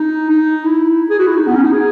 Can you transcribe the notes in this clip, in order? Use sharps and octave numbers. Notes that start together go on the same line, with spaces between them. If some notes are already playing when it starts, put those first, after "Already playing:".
Already playing: D#4
D#4
E4
G#4
F#4
E4
D#4
B3
C#4
D#4
G#4